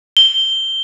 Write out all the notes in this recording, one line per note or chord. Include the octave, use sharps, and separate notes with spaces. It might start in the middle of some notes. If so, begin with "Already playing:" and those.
G7